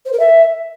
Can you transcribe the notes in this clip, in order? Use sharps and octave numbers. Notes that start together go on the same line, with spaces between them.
C5
A#4
E5